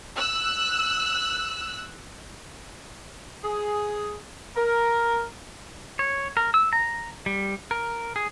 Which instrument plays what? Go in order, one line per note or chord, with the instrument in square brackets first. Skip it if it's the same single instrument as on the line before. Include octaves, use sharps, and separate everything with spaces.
[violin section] E6 F#6
[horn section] G#4
A#4
[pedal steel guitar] C#5
A#4
E6
A#5
G3
A#4
G#4